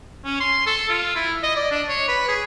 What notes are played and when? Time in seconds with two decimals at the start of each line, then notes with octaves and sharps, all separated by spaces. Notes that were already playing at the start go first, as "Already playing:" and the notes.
0.25 C#4
0.40 C6
0.67 A4
0.89 F4
1.15 E4
1.43 D#5
1.56 D5
1.71 D4
1.88 C#5
2.08 B4
2.28 G#4